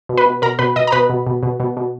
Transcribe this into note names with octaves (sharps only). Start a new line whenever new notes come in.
B2
B4 B5
B2
B2 A#4 A#5
B2 B4 B5
B2 D#5 D#6
A#5
B2 B4 B5
B2
B2
B2
B2
B2